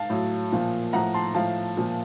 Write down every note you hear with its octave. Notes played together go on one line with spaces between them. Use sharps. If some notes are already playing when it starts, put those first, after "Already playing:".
Already playing: F5 A5
A2 F#3
A#2 F3
A2 F3 F#5 A#5
A5 C6
A2 F3 F5 A5
A#2 F3